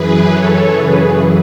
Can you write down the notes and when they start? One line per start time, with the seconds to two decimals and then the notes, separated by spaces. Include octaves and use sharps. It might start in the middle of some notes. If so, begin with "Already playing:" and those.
Already playing: F#2 E3 G#4 B4
0.29 A4 C#5
0.70 F#2 C#3 E3 G#4 B4